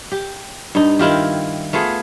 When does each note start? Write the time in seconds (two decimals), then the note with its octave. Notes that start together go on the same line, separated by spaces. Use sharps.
0.12 G4
0.75 G2 D#4
0.99 D#3 E4 F4 G4
1.73 A3 B3 F4 G#4